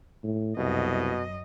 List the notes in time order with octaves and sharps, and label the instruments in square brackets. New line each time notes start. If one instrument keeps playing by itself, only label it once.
[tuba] A2
[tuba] C2 [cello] F#2 D#5 [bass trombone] B2